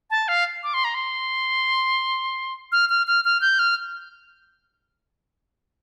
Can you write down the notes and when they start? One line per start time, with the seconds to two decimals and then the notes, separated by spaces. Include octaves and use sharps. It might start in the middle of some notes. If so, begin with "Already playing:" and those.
0.10 A5
0.28 F5
0.63 D6
0.74 C6
0.84 A#5
0.95 C6
2.72 F6
2.90 F6
3.07 F6
3.25 F6
3.41 G6
3.59 F6